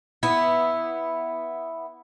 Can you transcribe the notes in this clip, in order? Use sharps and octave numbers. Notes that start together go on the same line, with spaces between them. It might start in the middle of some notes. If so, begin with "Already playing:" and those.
B3 E4